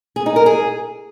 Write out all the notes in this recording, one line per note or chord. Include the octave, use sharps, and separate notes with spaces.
G#4
D#4
A#4
G#4